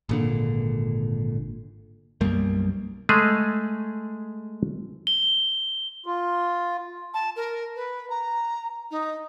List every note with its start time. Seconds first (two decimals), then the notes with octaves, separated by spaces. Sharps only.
0.09 G#1 A#2 D3
2.21 B1 F#2 G3 A#3
3.09 G#3 A3 G#4
5.07 G7
6.06 F4
7.14 A5
7.36 A#4
7.76 B4
8.10 A#5
8.91 D#4